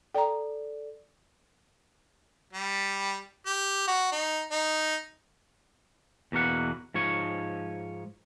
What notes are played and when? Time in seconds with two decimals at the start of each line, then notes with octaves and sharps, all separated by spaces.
0.15 A4 D5 G5 A#5
2.53 G3
3.46 G4
3.87 F#4
4.12 D#4
4.51 D#4
6.32 E2 B2 A#3 F#5
6.94 G#2 F3 C#5